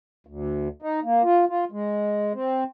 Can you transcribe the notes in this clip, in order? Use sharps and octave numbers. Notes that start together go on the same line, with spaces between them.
D2
D#4
A#3
F4
F4
G#3
C4